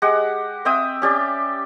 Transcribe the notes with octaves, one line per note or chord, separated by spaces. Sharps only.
G#3 G4 F#5
C4 E5 G5 D#6
C#4 G4 D5